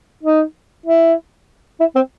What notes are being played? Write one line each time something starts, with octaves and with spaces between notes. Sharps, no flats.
D#4
E4
E4
C4